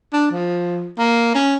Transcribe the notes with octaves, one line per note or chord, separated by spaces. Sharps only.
D4
F3
A#3
C#4